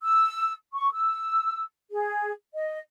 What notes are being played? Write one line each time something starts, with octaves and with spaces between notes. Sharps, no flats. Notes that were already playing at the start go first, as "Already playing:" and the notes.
E6
C#6
E6
G#4
D#5